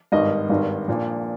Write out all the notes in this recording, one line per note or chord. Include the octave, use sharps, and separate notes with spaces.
G#1 G2 D#3 D#5
G#1 G2 D#3
A#1 A#2 F3